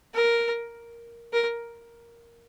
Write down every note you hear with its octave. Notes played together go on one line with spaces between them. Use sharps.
A#4
A#4